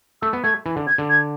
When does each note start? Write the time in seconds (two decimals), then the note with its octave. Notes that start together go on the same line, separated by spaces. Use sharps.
0.22 A3 E6
0.33 B3
0.44 A3 G#6
0.66 E3
0.76 D3
0.87 G#6
0.98 D3
1.09 G#6